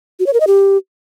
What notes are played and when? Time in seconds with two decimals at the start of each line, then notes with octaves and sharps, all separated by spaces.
0.20 F#4
0.26 C#5
0.33 A#4
0.40 D#5
0.47 G4